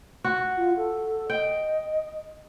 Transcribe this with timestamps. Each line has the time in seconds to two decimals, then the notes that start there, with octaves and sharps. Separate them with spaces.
0.24 F#4
0.57 F4
0.77 A4
1.30 D#5 G5